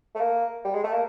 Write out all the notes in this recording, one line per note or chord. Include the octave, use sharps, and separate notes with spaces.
A3
A#3
G3
G#3
A3
A#3